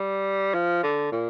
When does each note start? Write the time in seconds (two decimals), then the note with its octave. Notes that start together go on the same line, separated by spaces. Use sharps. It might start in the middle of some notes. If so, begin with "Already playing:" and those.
Already playing: G3
0.54 F3
0.83 D3
1.12 A#2